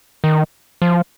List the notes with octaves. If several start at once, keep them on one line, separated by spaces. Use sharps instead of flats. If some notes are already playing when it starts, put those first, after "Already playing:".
D#3
F3